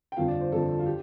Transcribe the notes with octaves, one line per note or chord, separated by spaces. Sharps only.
G5
G1 F2 F3 F5
D5
C5
G1 F2 F3 A4
F4
G4